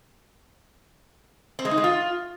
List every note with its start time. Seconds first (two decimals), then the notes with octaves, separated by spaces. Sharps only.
1.59 C4
1.65 G#3
1.71 D#4
1.78 G#3
1.84 F4